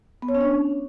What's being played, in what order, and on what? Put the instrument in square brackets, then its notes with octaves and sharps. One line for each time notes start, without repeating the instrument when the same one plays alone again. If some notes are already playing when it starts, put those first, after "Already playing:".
[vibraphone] B3
C#5
C#4
D4